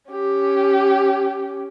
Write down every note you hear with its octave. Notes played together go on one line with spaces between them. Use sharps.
C#4 G4